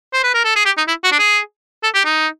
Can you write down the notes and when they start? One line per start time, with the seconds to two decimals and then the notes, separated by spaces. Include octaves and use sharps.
0.14 C5
0.24 B4
0.34 A#4
0.45 A4
0.56 G#4
0.66 G4
0.77 D#4
0.88 E4
1.04 F#4
1.12 D4
1.19 G#4
1.83 A4
1.95 G4
2.05 D#4